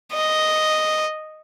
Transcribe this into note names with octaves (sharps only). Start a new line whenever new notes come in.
D#5